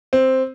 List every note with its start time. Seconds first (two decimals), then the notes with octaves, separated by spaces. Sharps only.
0.13 C4